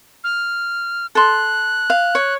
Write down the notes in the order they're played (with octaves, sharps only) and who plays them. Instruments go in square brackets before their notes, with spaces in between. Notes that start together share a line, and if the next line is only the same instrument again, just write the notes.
[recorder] F6
[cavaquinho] A4 C6 [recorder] F#6
[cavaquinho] F5
C#5